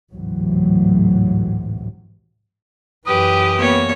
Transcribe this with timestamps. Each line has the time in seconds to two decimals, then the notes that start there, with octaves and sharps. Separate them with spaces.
0.12 A1 D2 G#2 C3 E3 F#3
3.07 F#2 E3 G4 B4 D#6
3.58 A#3 B3 C#5